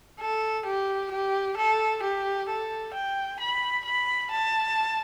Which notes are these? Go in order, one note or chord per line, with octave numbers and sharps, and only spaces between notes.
A4
G4
G4
A4
G4
A4
G5
B5
B5
A5